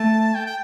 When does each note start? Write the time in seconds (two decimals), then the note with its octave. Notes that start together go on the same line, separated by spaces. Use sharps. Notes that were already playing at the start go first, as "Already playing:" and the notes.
Already playing: A3 A5
0.34 G5
0.46 G5